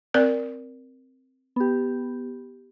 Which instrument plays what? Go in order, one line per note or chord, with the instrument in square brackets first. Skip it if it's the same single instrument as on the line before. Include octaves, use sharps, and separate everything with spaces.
[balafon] C4 A#4 D5
[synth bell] B3 G4